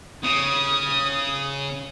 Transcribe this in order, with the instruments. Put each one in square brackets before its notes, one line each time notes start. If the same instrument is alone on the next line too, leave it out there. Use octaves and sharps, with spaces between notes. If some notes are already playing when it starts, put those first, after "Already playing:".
[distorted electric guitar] C#3 [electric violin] D#6